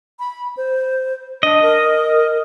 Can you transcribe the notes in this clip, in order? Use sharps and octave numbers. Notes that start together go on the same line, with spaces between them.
B5
C5
D4 D#5
A#4